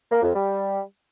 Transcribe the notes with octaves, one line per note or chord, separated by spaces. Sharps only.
A#3
F2
G3